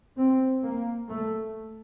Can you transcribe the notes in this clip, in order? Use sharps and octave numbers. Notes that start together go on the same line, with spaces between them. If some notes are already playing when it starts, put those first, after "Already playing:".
C4
A#3
A3